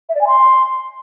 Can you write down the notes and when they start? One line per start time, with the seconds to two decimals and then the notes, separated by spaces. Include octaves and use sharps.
0.09 E5
0.15 D5
0.21 G#5
0.27 C6